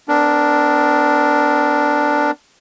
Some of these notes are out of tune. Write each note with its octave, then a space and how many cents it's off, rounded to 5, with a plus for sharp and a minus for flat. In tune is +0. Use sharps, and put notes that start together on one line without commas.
B3 +45 D4 +0 A#4 +0